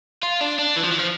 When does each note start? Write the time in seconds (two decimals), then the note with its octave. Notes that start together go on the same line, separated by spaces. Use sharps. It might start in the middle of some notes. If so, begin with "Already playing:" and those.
0.23 F4
0.41 D4
0.58 D4
0.76 E3
0.84 F3
0.92 E3
0.99 F3